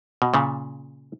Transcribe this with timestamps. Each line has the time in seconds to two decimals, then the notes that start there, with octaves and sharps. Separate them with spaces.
0.22 B2
0.34 A#2 C#3